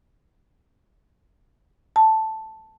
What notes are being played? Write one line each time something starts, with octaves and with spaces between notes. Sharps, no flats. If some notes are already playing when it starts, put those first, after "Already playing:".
A5